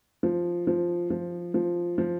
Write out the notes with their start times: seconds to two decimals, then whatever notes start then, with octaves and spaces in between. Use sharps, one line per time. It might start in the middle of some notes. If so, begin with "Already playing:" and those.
0.23 F3
0.67 F3
1.10 F3
1.54 F3
1.98 F3